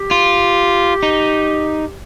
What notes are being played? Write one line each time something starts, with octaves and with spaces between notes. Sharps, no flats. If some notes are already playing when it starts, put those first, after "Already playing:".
Already playing: G4
F4
D#4